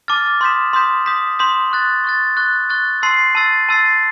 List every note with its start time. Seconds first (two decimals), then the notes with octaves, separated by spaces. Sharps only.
0.08 A5 D6 F6 A6
0.41 C6 D#6 G6 B6 E7
0.73 C6 D#6 G6 B6 E7
1.06 C6 D#6 G6 B6 E7
1.39 C6 D#6 G6 B6 E7
1.71 C#6 F#6 A6
2.04 C#6 F#6 A6
2.37 C#6 F#6 A6
2.70 C#6 F#6 A6
3.02 A5 C6 E6 A6 C7
3.35 A5 C6 E6 A6 C7
3.69 A5 C6 E6 A6 C7